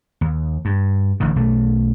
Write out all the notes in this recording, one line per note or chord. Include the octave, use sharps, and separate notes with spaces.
D#2
G2
A1 D3 D#3
B1 A3